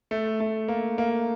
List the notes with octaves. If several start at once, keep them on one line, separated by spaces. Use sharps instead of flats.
A3
A3
A#3
A#3